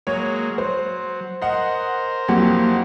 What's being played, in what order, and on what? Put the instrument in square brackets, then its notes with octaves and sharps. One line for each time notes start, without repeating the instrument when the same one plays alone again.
[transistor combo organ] F#3 G#3 A#3 [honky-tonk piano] C#5
[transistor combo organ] F#3 [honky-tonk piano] C5
[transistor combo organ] A#4 C5 [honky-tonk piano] D#5 F#5
[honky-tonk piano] F2 G4 F#5 [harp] F#3 A#3 E4